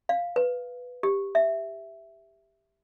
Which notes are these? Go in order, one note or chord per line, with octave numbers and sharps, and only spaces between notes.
F5
B4
G4
E5